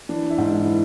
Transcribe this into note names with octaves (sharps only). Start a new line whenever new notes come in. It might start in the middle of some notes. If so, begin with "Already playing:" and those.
E3 D4
E4
G#2
E4
E3